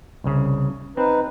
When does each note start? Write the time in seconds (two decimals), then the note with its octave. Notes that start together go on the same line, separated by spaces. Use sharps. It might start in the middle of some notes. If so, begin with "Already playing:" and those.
0.24 C2 C#3
0.97 C4 D#4 B4